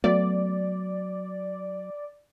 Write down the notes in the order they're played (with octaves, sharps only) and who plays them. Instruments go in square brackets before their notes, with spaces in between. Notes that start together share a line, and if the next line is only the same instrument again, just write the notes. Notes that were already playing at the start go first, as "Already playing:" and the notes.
[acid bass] F#3 [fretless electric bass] A3 B3 [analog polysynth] D5